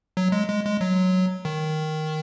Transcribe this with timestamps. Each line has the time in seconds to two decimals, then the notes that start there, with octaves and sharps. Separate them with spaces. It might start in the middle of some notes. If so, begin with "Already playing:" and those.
0.17 F#3
0.32 G#3
0.49 G#3
0.65 G#3
0.81 F#3
1.45 D#3